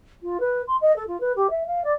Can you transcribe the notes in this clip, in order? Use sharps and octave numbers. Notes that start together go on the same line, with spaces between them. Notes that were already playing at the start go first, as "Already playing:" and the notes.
F4
B4
C6
D#5
A4
F4
B4
G4
E5
F5
D5